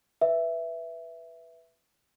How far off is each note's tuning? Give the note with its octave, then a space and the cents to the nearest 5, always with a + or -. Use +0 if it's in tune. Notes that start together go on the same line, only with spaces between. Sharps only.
B4 +0 E5 +5